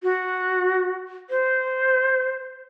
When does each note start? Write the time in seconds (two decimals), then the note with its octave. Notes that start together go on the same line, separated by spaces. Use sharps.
0.03 F#4
1.30 C5